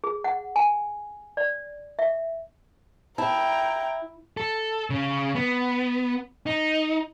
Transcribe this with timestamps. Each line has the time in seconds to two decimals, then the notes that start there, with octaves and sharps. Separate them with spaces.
0.04 G#4
0.24 F#5
0.56 G#5
1.37 D5
1.99 E5
3.18 E4 G5 A5 A#5
4.37 A4
4.90 C#3
5.35 B3
6.46 D#4